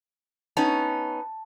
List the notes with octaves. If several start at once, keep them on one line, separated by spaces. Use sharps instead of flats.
B3 C#4 D#4 A5